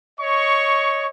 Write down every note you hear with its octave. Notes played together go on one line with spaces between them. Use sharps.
C#5 D#5 C#6